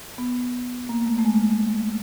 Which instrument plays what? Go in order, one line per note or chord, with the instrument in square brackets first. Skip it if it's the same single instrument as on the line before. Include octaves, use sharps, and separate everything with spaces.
[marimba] B3
A#3
A3
A3
G#3